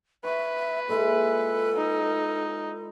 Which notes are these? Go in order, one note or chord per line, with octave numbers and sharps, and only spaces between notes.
B4 E5 C#6
A#2 G#3 E4 A4
D#4